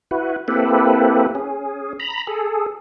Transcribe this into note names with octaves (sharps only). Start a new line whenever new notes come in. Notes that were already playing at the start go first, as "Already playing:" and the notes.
E4 F#4 B4
A#3 C4 E4 G4 A4 B4
C#4 G#4
A#5 B5
G#4 A4